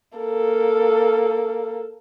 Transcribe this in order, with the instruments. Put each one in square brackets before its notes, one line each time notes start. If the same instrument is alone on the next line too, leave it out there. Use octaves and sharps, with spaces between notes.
[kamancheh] A#3 A4